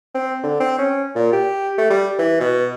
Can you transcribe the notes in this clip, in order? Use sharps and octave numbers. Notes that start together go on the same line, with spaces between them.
C4
D3
C4
C#4
A#2
G4
A3
G3
E3
B2